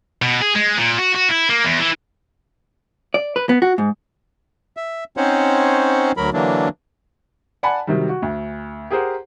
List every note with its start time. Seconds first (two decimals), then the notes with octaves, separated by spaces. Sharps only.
0.22 B2
0.41 G#4
0.55 G#3
0.78 A#2
0.99 F#4
1.16 F#4
1.31 E4
1.49 A#3
1.65 E2
1.80 E3
3.14 D5
3.36 B4
3.49 B3
3.62 F#4
3.78 G#2
4.77 E5
5.17 C4 C#4 D#4 C5 C#5 F#5
6.17 D2 F#3 A#4 B5
6.33 D3 E3 F#3 A#3 D4
7.63 D5 F#5 G#5 A5 B5
7.87 C3 D#3 F#3 G3
8.09 F#4
8.22 D2
8.90 G4 G#4 A#4 C5 F#5